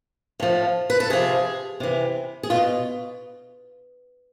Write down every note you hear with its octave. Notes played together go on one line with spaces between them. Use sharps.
A2 F3
B4
A4
C3 F3 G#4
C3 E3
G#4
B2 F4